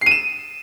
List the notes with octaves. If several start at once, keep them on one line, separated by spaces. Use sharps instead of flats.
C7 D#7 E7